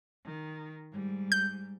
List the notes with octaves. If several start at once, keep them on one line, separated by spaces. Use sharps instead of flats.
D#3
G#2 G3
G6